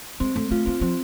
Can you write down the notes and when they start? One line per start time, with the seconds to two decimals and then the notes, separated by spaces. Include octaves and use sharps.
0.20 G#3 C4
0.35 A3 C4
0.51 A3 F4
0.66 A#3 C4
0.81 F3 C4